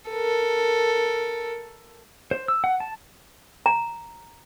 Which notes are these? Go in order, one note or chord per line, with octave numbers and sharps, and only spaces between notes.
A4 A#4
C5
E6
F#5
A5
A#5